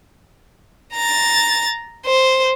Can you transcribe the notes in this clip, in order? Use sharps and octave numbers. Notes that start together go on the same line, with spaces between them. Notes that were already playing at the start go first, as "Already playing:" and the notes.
A#5 A6
C5